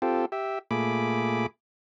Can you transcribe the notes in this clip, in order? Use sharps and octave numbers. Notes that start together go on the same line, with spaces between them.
C4 F4 G4 A4
G4 E5
A#2 A3 G#4 B5 D6